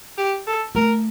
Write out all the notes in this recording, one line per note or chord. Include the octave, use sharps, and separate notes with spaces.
G4
A4
A3 A#4